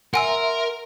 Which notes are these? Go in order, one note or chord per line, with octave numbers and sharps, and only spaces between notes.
A#4 E5 F#5 G#5 C6 E6